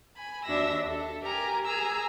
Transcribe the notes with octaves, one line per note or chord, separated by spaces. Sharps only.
G#5 B5
D#2 D4 F#4 E5 E6 A#6
A4
G4 A#4 G#5 A#5
G#4 G#5 A#5 E6